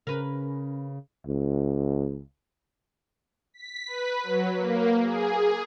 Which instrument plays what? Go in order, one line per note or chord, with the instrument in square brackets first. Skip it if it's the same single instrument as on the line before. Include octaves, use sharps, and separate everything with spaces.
[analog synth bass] C#3 [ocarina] C#4 [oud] A#4 B4
[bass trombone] C#2
[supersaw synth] B6
B4
F#3
A#3
G#4